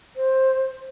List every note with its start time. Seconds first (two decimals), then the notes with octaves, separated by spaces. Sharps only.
0.16 C5